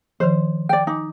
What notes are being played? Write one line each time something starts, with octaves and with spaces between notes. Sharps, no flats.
D#3 F3 C5
D5 G5
D#4 G#5 D6